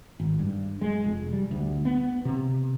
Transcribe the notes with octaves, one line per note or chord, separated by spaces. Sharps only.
G#1
G2
G#3
F1
G3
D2
B3
C3